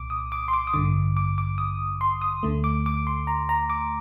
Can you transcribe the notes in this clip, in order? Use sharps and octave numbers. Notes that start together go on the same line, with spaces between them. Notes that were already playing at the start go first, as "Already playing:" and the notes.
Already playing: C2 A#2 D6
D#6
D6
C6
D6
D#6
A1 G2 D3 D6
D6
D6
D#6
C6
D#6
D2 D3 A3
D6
D6
C6
A#5
A#5
D6